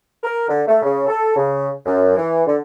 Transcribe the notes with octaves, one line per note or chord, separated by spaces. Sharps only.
A#4
D3
A3
C#3
A4
C#3
F#2
E3
D3